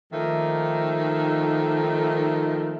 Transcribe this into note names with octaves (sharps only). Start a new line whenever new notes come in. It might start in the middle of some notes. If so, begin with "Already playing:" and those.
D#3 F3 A3 A#3 D#4